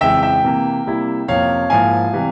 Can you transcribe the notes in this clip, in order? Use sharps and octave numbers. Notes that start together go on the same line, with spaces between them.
F2 C#3 E3 G#3 E5 G5
E5 G5
C3 E3 A#3
C3 G3 A#3 E4
F2 C3 F3 A#3 C#4 C#5 F5
G#2 F3 A#3 E4 F5 G#5
C3 E3 G3